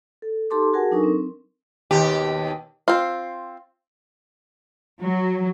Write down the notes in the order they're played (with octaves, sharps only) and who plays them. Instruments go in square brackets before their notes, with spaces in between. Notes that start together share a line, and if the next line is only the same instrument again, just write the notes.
[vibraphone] A4
D#4 G4 A4 A5 C6 D6
F#4 G#4 A#4 F#5 G#5 A5
F#3 D4 D#4 A4 A#4 C#6
C4
[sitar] D#2 B2 G4
[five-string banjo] C4 F4
[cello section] F#3